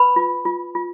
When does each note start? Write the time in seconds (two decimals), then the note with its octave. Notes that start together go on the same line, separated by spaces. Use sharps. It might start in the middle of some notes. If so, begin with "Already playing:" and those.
Already playing: B4 B5
0.16 F4
0.45 F4
0.75 F4